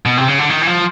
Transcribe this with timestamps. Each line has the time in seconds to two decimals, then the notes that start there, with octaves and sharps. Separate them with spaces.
0.06 B2
0.17 C3
0.28 C#3
0.39 D3
0.50 D#3
0.61 E3
0.67 F3